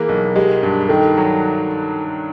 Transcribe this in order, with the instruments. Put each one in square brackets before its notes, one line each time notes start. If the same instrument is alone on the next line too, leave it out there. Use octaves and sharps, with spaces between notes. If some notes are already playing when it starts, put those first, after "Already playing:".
Already playing: [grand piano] E3 A#3 [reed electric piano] G#4
[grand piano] B1
[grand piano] G#3 [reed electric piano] G4
[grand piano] G2
[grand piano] D#3 [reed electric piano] A4
[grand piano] F#3